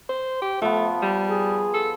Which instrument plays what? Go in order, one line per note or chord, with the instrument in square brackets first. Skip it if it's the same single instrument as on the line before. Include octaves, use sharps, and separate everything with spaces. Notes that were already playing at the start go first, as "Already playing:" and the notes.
[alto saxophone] C5
G4
[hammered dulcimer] F3 B3 [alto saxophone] A3
[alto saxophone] G3
[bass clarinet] G#4
[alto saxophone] A4